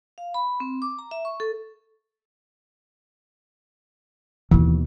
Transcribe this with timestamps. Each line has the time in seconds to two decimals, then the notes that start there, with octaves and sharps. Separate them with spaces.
0.18 F5
0.34 B5
0.60 C4
0.82 D6
0.99 A#5
1.11 E5
1.25 C#6
1.40 A4
4.51 D#2 B2 E3